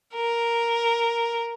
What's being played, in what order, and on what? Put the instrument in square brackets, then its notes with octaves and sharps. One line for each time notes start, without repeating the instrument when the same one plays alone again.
[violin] A#4